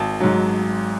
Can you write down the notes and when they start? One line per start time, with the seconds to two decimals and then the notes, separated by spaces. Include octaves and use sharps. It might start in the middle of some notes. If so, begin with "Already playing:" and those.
Already playing: G#1 A5
0.20 G#2 F#3